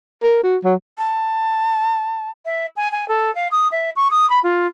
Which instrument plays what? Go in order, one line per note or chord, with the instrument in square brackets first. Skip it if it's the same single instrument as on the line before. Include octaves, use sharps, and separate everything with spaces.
[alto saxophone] A#4
F#4
F#3
[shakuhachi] A5
[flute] E5
G#5
G#5
A4
F5
D#6
E5
C#6
D#6
B5
F4